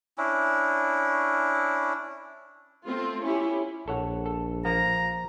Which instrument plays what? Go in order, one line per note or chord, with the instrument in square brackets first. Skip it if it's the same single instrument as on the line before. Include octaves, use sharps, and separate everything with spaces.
[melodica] C#4 D4 E4
[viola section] A3 C4 F4
C#4 E4 G4
[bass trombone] A#1 [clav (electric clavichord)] A4 C#5 F#5
[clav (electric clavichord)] A4
[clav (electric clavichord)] F3 A#3 [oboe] A#5